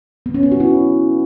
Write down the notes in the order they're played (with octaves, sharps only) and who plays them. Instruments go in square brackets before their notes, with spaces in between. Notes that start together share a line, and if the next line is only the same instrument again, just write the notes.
[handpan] B3
C#4
B3
F#4
E4